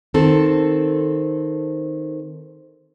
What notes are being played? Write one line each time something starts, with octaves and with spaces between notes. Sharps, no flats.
D#3 C4 A4